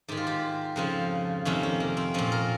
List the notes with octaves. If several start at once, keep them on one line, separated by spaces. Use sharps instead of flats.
G#2 D#3 G4
F4
G4
F2 C#3 F3
F2 C3 D#3 C#4
C#4
A#3
C4
A#2 F3 C#4
A#4